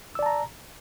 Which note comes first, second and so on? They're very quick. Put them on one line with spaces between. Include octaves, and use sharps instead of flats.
E6 D5 A5 A#5